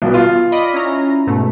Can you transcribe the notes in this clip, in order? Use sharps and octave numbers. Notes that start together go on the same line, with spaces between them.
B1 B3
F4
D5 D#5 B5
C#4 E4 A#5
G#2 B2 A3